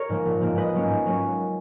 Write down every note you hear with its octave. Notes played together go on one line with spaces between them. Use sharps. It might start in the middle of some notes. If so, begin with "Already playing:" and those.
Already playing: A#4 C#5
G#2 F3 A#3
A#1
G#2 F3 A#3
G#2 B4 D#5
F#3 A#3 C#4
G#2
F#3 A#3 C#4